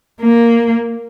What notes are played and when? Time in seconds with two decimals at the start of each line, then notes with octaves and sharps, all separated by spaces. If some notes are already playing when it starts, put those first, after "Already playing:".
0.21 A#3